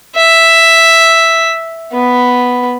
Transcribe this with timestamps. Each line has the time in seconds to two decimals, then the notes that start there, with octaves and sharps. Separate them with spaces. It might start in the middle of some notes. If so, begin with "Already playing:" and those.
0.16 E5
1.93 B3